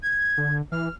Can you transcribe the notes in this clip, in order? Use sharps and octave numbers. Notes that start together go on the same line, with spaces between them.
G#6
D3
E3 F6